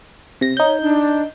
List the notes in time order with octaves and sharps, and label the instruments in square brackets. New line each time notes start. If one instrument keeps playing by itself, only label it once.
[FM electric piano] C3 A#6
[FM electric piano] D#4 G6 [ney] C#5
[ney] D4